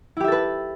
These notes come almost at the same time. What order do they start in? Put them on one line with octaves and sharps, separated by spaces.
E4 G4 E5 A4 B4